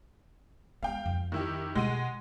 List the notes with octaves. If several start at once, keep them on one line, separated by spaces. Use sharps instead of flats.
G#3 B3 F5 G5
F2
D#3 E4 G4
B2 G#3 F#5 D#7